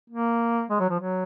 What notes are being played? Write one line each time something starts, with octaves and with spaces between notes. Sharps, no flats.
A#3
G#3
F#3
F3
F#3